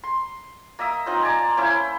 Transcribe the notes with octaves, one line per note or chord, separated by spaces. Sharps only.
C6
A#3 D#5 E5 D#6
C4 D#4 F4 C5
D5 G#5 A#5
A5
A#3 C#4 E4 C5